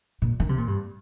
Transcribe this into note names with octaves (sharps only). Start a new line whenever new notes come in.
A#2
D#3
C3
A#2
G2